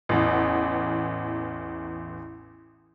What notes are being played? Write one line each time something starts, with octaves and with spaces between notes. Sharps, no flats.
A1 E2